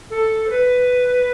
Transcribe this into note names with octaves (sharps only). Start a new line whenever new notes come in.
A4
C5
B4